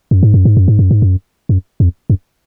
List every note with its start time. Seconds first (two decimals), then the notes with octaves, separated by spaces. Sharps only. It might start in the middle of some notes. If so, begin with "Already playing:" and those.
0.11 F#2
0.23 G#2
0.34 F#2
0.45 G#2
0.57 F#2
0.68 G#2
0.79 F#2
0.91 G#2
1.02 F#2
1.49 F#2
1.80 F2
2.10 F#2